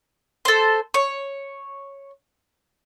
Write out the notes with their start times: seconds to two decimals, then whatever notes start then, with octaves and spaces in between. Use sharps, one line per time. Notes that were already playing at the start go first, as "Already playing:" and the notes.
0.45 A4 C5
0.94 C#5